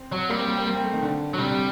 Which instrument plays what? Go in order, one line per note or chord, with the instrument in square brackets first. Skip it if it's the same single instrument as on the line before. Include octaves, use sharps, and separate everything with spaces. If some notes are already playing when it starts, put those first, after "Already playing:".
Already playing: [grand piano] C4
[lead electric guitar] F#3
[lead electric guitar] G3 [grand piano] A#3
[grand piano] C4
A#3
C4
A#3
C4
A3
D#3
D3
[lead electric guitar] F#3
[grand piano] C3 [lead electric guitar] G3